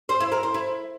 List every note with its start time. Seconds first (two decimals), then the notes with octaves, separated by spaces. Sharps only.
0.09 C5
0.20 E4
0.32 A#4
0.43 C5
0.54 E4